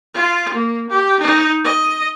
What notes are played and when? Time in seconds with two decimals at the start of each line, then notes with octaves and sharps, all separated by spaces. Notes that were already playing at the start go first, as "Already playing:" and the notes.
0.14 F4
0.54 A#3
0.89 G4
1.20 D#4
1.64 D#5